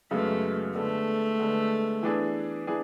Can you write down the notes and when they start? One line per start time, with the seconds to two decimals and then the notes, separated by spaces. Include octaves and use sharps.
0.11 F#2 C#3 G#3 A3 B3
0.75 D3 G#3 A3 B3
1.39 D3 G#3 B3
2.03 E3 B3 D4 G#4
2.67 E3 B3 D4 G#4